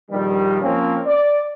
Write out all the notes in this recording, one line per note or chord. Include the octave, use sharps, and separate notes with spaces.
A#1 G2 D#3 G3
F3 A#3 C4 C#4
D5